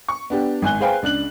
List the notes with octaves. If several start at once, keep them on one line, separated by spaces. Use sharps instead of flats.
C#6
B3 D4 G4
G#1 G#5 F#6 G7
G#4 B4 C5 F5 G5 G#5
C#2 D4 F#6 F#7